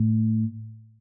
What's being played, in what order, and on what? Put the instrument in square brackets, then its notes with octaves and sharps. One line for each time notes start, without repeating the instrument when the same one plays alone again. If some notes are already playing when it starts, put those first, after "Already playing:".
Already playing: [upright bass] A2